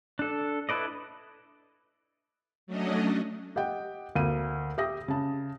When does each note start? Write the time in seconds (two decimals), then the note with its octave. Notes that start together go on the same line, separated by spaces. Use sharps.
0.19 D4 A4
0.69 E4 A4 B4 D5 D#5
2.67 F#3 A3 C#4 D4 D#5
3.56 G4 D#5 F#5 G5
4.16 D2 A#3 D#7
4.78 G4 E5 G5 D#6 A#6
5.08 C#3 A5